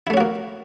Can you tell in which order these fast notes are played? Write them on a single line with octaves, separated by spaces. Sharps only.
E4 A3 C#4 F#4 A#3